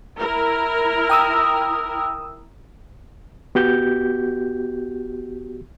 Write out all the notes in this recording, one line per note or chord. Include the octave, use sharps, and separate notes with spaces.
E4 A#4
G5 D#6 E6
B3 F#4 G4 G6